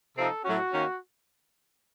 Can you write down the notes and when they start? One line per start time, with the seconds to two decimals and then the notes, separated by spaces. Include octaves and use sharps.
0.16 C3 F3 C4 D#4 A4
0.44 A2 F#3 A3 C#4 F#4
0.72 D#3 A#3 C#4